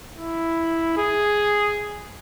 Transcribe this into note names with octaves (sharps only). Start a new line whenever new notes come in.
E4
G#4